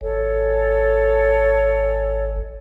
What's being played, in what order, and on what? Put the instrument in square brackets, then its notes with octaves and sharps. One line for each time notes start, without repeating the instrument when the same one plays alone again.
[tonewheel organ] G#1 [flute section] A4 C#5